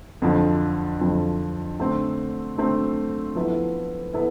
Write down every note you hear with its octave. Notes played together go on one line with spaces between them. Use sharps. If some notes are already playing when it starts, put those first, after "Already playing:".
F2 D3 F3
F2 D3 F3
D3 A3 C4
D3 A3 C4
F3 B3 E4 A4
B3 E4 A4